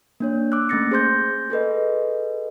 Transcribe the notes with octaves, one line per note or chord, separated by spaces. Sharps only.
A#3 D4 C#5
D6 E6 F#6
A3 A#3 C#4 A6 A#6 C#7
G#4 C5 C6 G6 A#6
G#4 A4 B4 D#5